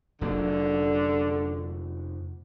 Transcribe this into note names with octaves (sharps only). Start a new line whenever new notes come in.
F1 D3 F#3 A#3